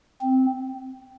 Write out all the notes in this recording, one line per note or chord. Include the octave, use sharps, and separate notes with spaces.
C4